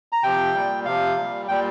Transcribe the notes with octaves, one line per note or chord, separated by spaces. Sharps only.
A#5
C3 F3 G5
A#2 G3
C3 F3 F5
A#2 G3
A#2 G3 G5